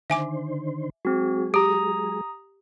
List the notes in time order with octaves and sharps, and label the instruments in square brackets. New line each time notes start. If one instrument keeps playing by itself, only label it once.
[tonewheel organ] D3 D#3 C5 [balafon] E5 G#5 D6
[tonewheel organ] F#3 G#3 G#4 [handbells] C4 F#4
[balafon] G4 [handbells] A#5 D#6